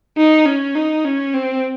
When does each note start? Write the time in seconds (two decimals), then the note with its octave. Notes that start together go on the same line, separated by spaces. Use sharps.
0.17 D#4
0.46 C#4
0.75 D#4
1.05 C#4
1.34 C4